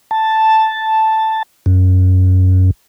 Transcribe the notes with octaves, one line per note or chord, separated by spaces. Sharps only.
A5
F#2